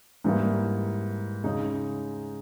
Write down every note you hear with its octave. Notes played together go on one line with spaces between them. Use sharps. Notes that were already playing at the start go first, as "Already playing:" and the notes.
G#2 E3 G3 A#3
C#3 G#3 D#4